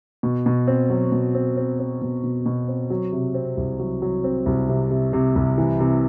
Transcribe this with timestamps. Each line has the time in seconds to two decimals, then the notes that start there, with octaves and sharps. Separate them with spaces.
0.23 B2
0.46 B2
0.67 C4
0.90 F#3
1.12 B2
1.35 C4
1.57 C4
1.79 C4
2.02 B2
2.24 B2
2.46 B2
2.68 C4
2.90 F#3
3.12 C3
3.34 C4
3.57 C2
3.79 F#3
4.02 F#3
4.24 C4
4.46 C2
4.69 C3
4.90 C3
5.13 C3
5.36 C2
5.58 E3
5.80 C3